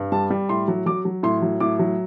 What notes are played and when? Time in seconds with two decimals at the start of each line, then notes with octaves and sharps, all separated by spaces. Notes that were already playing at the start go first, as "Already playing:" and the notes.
Already playing: G2
0.12 G3 A5
0.30 G3
0.49 A2 C6
0.68 F#3
0.86 F#3 D6
1.05 F#3
1.23 A2 C6
1.42 F#3
1.60 A2 D6
1.79 F#3